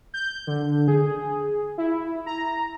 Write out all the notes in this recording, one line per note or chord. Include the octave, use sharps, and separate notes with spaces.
G6
D3
G#4
E4
A#5